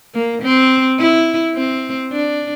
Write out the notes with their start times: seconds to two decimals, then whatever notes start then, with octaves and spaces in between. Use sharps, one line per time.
0.14 A#3
0.43 C4
0.99 E4
1.55 C4
2.12 D4